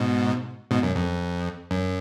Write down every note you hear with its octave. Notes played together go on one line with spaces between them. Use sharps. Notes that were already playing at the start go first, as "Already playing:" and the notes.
Already playing: G#2 B2
G#2 B2
F#2
F2
F#2